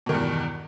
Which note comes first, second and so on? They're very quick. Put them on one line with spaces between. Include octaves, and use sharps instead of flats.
B2 D#3 G2 E2